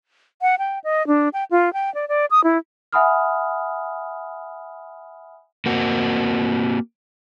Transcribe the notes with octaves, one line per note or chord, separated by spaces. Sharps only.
F#5
G5
D#5
D4
G5
F4
G5
D5
D5
D#6
E4
E5 F#5 G#5 B5 D#6 F6
A#3 C4 F#4